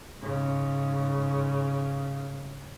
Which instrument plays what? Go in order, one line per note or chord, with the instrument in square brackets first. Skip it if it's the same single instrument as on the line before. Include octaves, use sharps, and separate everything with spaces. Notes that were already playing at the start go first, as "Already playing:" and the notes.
[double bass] G#2 C#3